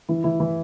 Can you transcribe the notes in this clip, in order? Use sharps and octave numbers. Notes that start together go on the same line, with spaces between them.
E3 E4
E3 E4
E3 E4